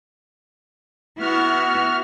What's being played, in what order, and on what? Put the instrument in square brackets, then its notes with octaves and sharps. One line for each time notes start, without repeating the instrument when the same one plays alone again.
[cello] B3 E4 [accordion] F#4 F6